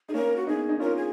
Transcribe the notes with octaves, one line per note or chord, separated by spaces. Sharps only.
D#4 G#4
A#3 C#4 A#4
F#4
B3 D#4 G#4
D#4
C#4 F4 A#4
G#4